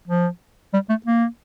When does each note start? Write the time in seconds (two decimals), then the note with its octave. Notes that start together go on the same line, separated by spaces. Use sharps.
0.07 F3
0.73 G3
0.89 A3
1.06 A#3